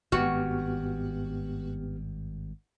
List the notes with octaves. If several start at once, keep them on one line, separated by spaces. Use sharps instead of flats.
G#1 G2 B3 F#4 G4 F6